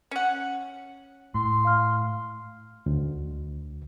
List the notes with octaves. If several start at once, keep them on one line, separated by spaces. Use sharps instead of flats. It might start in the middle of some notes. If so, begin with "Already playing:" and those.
C#4 F#5
A2 C6
F5 F6
D2